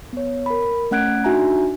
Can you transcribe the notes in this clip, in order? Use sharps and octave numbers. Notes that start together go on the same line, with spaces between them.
B3 C#5
A#4 B5
A3 C#4 F#5 F#6 G#6 D7
D4 D#4 F#4 E5 G#5 A#5